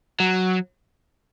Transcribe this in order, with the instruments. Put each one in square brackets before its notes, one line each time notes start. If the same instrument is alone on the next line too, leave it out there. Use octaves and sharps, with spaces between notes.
[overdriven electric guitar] F#3